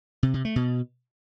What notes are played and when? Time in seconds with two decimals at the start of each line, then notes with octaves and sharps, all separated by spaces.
0.23 C3
0.34 C3
0.45 A3
0.56 B2